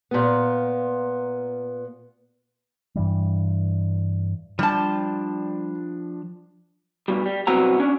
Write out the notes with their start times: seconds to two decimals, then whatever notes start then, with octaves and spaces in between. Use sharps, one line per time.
0.11 A#2 B3
2.96 G2 E3 G3
4.59 F3 G3 D4 G5 A5
7.08 G2 B2 G3
7.26 G3
7.47 C2 F#3 B3 C4 F#4 A#5
7.80 C#4 D4